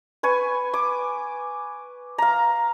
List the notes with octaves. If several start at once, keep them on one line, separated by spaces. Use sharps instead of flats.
B4 G#5 C#6
D6
F5 A#5